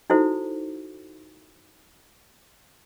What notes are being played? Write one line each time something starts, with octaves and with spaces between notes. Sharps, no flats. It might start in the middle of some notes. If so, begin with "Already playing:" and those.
D#4 E4 F#4 A4 C5